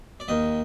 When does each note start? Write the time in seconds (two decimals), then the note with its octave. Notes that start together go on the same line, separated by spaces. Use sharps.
0.20 D5
0.28 D#2 D#3 D#5